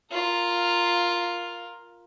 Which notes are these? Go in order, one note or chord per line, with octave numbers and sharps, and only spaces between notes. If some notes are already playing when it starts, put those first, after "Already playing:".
F4 A#4